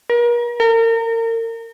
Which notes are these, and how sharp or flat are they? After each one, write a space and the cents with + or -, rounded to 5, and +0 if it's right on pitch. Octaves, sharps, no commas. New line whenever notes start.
A#4 +35
A#4 -35